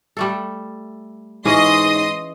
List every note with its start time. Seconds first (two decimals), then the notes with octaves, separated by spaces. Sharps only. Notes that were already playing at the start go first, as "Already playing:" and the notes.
0.17 G3 A3 A4
1.45 G#2 E3 C#4 G#4 D#5 C6 D#6